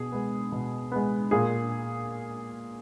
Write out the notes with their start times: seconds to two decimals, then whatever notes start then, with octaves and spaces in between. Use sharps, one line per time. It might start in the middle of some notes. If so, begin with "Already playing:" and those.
Already playing: B2 G#4
0.12 G#3 B3
0.52 B2
0.92 G#3 B3
1.31 A#2 G#4